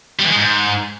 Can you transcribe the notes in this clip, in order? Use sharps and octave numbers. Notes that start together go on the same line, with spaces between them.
G3
E3
G#3
G#2